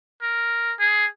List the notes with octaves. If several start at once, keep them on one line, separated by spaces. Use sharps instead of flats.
A#4
G#4